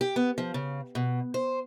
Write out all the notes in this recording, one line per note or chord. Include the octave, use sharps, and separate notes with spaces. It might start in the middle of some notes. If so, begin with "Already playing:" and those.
G4
B3
F3
C#3
B2
C5